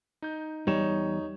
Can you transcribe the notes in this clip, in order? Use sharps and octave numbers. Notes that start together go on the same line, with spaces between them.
D#4 G6
E2 G3 D#4 C#5 E7